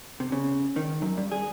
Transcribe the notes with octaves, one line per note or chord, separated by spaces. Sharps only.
C3
C#3
D#3
F#2
G2
G#4